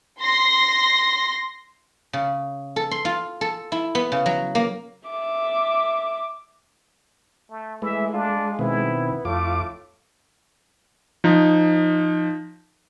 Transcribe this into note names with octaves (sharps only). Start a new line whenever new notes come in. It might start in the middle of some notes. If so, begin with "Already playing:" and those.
C6 A#6
C#3
A4
C6
F4
A4
E4
B3
C#3
F#3
A#3
E5 D6
A3
E3 G#3 A3 E5
D4 F4
B2 D#3 B3 C4 E4
F2 A2 A3 F4 D6
F3 D#4